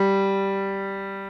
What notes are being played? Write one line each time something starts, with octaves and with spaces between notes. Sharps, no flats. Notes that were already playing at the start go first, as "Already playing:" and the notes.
Already playing: G3